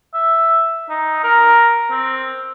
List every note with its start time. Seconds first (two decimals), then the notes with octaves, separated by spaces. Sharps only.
0.14 E5
0.90 D#4
1.24 A#4
1.91 C4